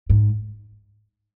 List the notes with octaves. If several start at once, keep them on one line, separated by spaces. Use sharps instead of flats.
G#2